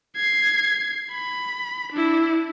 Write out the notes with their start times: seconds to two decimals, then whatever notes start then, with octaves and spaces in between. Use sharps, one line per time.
0.17 G#6 C7
1.12 B5
1.92 D4 E4